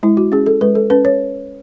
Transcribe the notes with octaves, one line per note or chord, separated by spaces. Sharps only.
G#3 E4
F#4
C#4 G#4
A4
G#3 B4
A4
C#4 B4
C#5